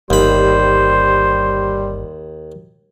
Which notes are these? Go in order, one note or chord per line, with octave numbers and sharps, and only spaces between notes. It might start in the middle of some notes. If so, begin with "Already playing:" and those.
G1 D#2 G3 C5 B5